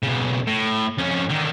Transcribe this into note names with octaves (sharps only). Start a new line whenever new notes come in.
B1 C#3
A2
F2 C#4
D3 D#3